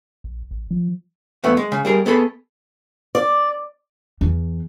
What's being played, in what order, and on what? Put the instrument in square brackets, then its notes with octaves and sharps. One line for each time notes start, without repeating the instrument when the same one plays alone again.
[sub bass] A#1
A1
F3
[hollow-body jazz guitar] E2 A3 B3
G#3
C#3
G3 G#4 A#4
B3 G#4 A4 B5
[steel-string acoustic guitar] D5
[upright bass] E2